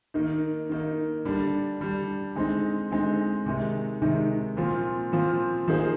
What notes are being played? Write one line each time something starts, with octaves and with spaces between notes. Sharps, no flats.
D#3 A#3 D#4
D#3 A#3 D#4
D3 G3 D4
D3 G3 D4
D3 G#3 C4 D#4
D3 G#3 C4 D#4
C3 D#3 G#3 D#4
C3 D#3 G#3 D#4
A#2 F3 C4 F4
A#2 F3 C4 F4
F3 A#3 D#4 G#4 C5